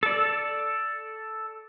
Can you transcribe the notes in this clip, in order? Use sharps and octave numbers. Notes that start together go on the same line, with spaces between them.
A4 D5